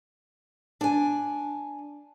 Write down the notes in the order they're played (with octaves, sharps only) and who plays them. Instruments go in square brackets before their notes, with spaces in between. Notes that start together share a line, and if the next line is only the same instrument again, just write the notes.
[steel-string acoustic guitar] D4 G#5